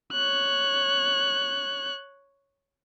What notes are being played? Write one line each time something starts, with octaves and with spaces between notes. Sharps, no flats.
C#5 F#6